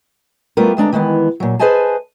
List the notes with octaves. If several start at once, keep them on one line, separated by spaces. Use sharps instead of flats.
G3 A3 B3 F4 A#4
D2 G#3 D4 A#5
D#3 E3 G#3 B3
A#2 F#3
G#4 B4 C5 D#5 G#5 A5